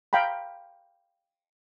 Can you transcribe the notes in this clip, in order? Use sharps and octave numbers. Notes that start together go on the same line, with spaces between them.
F5 G5 A#5 B5